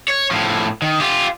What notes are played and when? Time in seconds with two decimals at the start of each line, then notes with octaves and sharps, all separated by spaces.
0.08 C#5
0.31 A2 F3
0.82 D#3
1.00 F4 G4